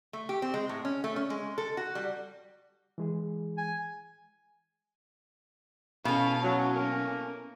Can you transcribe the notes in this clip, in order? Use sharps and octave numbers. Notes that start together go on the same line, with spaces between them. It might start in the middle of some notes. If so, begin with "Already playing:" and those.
A3
G4
C4
G#3
A2
C#4
A3
C#4
G#3
A4
F#4
G3
E3 G#3 G#4
G#5
B2 C#4 E4 A4 F5
F#3 C#4
A#3 A#4